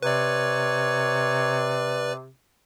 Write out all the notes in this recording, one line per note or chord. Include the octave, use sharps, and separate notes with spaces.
C3 B4 C#5 D5